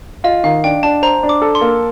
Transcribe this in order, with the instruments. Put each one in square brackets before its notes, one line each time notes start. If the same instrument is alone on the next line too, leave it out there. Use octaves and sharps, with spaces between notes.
[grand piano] F4 [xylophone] D#5
[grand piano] D#3 [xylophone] F5
[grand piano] D4 [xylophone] G5
[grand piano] D4 [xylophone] A5
[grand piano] C5 [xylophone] A#5
[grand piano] D4
[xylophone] D6
[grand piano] A4
[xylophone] C6
[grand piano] A#3